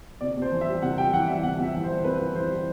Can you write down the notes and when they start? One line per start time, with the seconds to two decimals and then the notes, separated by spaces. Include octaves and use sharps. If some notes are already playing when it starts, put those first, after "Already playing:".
0.21 C3 D5
0.37 C3 C5
0.52 E3
0.61 E5
0.67 G3
0.82 C3 F#5
0.98 C3 G5
1.13 E3 F#5
1.28 G3 E5
1.43 C3 F#5
1.59 C3 E5
1.74 E3
1.84 C5
1.89 G3
2.04 C3 B4
2.20 C3
2.35 E3 C5
2.50 G3